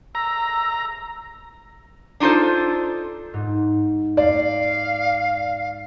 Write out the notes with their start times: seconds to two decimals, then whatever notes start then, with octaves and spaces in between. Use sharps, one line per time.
0.15 A#5 E6
2.20 D4 D#4 F4 A4 C5
3.34 G#2
4.17 D5 F5